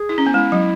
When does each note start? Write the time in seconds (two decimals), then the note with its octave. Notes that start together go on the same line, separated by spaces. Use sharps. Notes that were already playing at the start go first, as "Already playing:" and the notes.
Already playing: G#4
0.09 E4
0.18 C#4
0.26 B3
0.34 G#3 E4
0.52 F#3